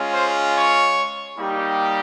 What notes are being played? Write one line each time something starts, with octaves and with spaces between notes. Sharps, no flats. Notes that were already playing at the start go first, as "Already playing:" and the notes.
Already playing: G#3 C#4 F4
C5
C#5
G3 A#3 D#4 G4